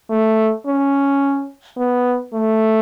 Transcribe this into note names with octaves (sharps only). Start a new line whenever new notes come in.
A3
C#4
B3
A3